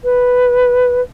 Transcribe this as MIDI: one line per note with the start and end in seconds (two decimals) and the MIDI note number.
0.03 1.00 71